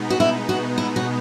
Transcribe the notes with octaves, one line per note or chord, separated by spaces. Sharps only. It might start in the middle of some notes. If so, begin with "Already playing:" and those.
Already playing: B2 G#3 B3 D#4
F#4
E4
F#4
E4
F#4